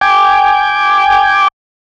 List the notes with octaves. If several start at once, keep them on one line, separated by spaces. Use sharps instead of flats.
G5 G#5 D6